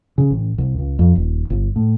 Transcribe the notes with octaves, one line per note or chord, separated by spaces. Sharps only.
C#3
A1
C2
C#2
F2
D#1
G1
A2